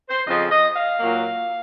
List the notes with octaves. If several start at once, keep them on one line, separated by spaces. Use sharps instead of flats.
C5
F2 C#3 F3 D#5
D#5
F5
A#2 F#3 A#3